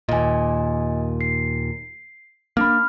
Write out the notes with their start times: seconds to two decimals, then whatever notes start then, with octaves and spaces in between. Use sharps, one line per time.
0.09 D#2 A#2 D#5 G#5
1.21 C7
2.57 A#3 D4 B5 F6